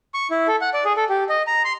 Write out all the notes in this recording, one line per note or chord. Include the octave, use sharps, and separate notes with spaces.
C#6
E4
A4
F#5
D5
G#4
A4
G4
D#5
A#5
C6